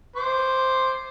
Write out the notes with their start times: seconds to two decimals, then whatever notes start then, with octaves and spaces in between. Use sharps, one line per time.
0.16 C5 D6